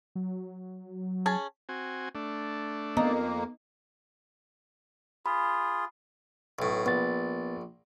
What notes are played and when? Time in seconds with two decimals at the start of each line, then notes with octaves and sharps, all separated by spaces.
0.15 F#3
1.26 C#4 G#4 A5
1.69 C4 F#4 G#5
2.15 A3 D4
2.97 F2 A#3 B3 D#4
5.26 F4 G#4 B5
6.59 B1 A2
6.86 A#1 B3 A6